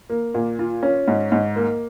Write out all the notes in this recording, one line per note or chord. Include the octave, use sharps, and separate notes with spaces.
A#3
A#2
F4
C#4
G#2
G#2
A#3